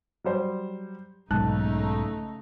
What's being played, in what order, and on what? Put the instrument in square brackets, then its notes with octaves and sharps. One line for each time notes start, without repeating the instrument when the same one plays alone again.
[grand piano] F#3 G3 C5
[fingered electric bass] B1 G#2 [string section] C#3 A3 D#4 [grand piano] A5 F#6